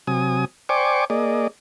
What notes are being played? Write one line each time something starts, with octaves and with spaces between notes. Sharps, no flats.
C3 F#3 G#5 D#6
C5 D5 G5 G#5 C#6 D6
A#3 G#4 D5 D#5